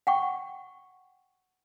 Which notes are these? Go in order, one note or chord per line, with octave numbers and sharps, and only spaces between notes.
F#5 G5 C#6